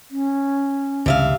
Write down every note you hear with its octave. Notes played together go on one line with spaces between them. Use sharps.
C#4
C#2 G2 C3 E3 E5 F5